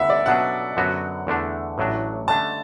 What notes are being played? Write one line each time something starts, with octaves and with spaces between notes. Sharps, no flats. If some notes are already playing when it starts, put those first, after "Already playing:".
Already playing: D2 D3 B3 E4 E5 F#5
D5
B2 F#3 D4 A4 F#5
F#2 D3 F#3 B3 F#4
E2 D3 A3 D4
A1 A2 F#3 D4
D3 A3 D4 A5